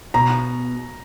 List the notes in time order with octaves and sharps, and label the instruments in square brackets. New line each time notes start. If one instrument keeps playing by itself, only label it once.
[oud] B2 [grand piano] A#5